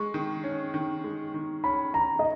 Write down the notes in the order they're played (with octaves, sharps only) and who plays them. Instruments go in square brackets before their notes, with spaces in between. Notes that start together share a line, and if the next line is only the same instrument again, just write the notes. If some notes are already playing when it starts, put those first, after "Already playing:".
Already playing: [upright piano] G#3 [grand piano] C#6
[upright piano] D#3
C#4
D#3
G#3
D#3
[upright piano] C#4 [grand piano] B5
[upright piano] D#3 [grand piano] A#5
[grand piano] D#5